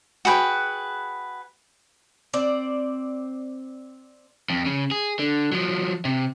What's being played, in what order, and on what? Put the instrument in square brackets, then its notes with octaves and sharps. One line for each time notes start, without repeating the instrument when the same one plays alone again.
[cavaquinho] F#4 G#4 B4 G5
[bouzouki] C4 D5
[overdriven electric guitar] F2
C#3
G#4
D3
F3 F#3
C3